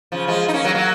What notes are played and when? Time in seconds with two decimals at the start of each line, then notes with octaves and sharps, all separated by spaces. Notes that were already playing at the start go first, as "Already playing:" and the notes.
0.12 C#3 F3
0.28 F3 G#3
0.48 D#4
0.54 A#3 C#4
0.64 F#3 A#3
0.75 F#3 A#3